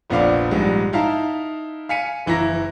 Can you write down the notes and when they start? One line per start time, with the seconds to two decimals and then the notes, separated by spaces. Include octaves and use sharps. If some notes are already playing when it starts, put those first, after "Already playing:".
0.10 F1 A#1 B3 D4 F5 D6
0.51 A#1 G#2 G3 G#3
0.93 D#4 E4 F5 A5 A#5
1.89 F5 G#5 B6 C#7 D#7
2.26 F#1 E3 E4 A#5 A#6